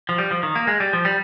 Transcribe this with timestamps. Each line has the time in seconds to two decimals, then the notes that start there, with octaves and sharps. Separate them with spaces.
0.09 F3
0.18 G3
0.31 F3
0.43 D#3
0.55 A#3
0.67 G#3
0.80 G3
0.93 F3
1.05 G3